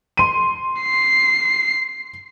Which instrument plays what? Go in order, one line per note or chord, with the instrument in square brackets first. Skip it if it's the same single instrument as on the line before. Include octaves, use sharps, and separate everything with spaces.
[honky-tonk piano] C6 D#7
[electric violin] C7